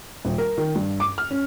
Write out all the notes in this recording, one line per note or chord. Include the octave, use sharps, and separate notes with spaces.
D#1
A#4
D#3
G2
D6
F6
C#4